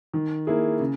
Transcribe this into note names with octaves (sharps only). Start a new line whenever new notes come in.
D#3
A#3 E4 G#4
C#3